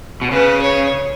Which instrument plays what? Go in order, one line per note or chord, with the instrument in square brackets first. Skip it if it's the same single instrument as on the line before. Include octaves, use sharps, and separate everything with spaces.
[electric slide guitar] B2
[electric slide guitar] C#3 [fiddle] B4
[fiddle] C#5